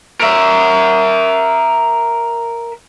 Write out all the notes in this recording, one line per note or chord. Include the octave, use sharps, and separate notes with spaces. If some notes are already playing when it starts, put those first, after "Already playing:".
A#4 E5